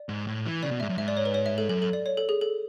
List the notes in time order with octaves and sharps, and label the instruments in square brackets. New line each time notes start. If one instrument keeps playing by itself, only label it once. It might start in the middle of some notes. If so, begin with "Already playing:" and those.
Already playing: [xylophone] D5
[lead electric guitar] G#2
A2
E3
[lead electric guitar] C#3 [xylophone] D5
[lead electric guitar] B2
[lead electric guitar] G#2 [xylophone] E5
[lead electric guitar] F#2
[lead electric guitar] G#2 [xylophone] E5
[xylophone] D5
C#5
B4
C#5
E5
A4
[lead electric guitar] F#2 [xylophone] A4
[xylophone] A4
D5
C#5
A4
G#4
A4